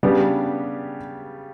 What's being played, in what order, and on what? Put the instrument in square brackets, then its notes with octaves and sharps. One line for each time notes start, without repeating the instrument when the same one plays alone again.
[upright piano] C#3 G3 B3 D4 G4